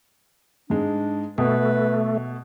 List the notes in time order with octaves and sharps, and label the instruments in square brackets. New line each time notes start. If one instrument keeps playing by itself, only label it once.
[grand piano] G#2 G#3 [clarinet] D4
[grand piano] B2 [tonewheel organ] A3 [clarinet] B4